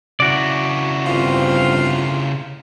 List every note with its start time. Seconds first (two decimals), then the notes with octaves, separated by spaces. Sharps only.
0.20 C#3 E4 F#4 D5
1.06 G1 C4 F4